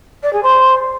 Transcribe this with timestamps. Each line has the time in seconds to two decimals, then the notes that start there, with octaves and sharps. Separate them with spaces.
0.23 D5
0.33 G#4
0.42 C5